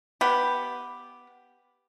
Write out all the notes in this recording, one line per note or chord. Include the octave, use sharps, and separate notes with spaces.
B3 G4